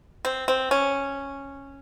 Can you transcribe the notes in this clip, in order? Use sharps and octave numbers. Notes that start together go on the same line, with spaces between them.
C4
C4
C#4